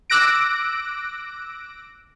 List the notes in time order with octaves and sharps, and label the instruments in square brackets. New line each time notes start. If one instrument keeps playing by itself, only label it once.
[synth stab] D6 E6 F#6 A#6 D7